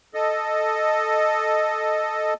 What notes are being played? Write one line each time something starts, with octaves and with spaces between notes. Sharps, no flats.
A4 D#5